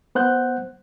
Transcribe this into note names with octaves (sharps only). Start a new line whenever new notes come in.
B3 C5 F#5 F#6 G6